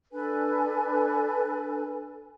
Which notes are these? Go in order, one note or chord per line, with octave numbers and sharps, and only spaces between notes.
D4 A4 B4 G#5